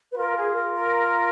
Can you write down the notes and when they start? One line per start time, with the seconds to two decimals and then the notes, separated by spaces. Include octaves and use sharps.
0.12 B4
0.17 F4 A#4
0.36 G#4
0.55 A#4
0.74 A#4